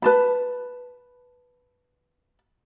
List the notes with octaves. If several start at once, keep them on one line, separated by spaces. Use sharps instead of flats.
B4 A5 B5